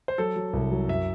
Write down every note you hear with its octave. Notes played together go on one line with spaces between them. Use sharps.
C5
F#3 A4
F#3
C2
F#3
F#2 E5